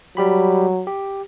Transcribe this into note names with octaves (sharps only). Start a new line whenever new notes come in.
F#3 G3 G4 B5
G4